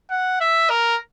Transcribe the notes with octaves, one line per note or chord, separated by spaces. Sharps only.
F#5
E5
A#4